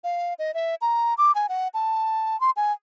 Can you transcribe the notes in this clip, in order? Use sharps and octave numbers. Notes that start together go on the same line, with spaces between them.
F5
D#5
E5
A#5
D6
G#5
F#5
A5
C6
G#5